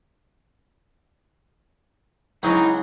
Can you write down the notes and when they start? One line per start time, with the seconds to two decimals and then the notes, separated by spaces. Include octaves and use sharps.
2.43 C#2 F#3 C4 D#4 E4